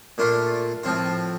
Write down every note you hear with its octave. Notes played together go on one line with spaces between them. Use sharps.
A#2 A3 D4 F4
A2 F3 C4 F4